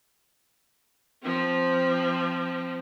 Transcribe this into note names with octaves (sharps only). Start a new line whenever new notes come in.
F3 C4